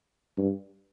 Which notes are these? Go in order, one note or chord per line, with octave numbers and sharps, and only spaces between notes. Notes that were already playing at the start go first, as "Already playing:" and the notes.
G2